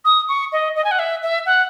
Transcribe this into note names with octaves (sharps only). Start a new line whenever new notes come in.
D#6
C#6
D#5
D#5
G#5
F#5
E5
E5
F#5